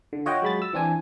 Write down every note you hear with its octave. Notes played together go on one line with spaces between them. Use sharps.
D3
F4 C#5 D#5 F#5 G5
F#3 G#3 B5 A6
E6
E3 C4 D4 G#5